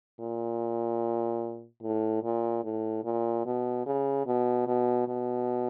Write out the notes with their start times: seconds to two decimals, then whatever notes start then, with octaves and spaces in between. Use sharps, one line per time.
0.20 A#2
1.82 A2
2.23 A#2
2.64 A2
3.04 A#2
3.45 B2
3.86 C#3
4.26 B2
4.67 B2
5.08 B2